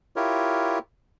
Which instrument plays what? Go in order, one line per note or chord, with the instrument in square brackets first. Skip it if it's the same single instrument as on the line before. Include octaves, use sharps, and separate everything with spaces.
[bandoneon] E4 F4 G4 A#4 C#5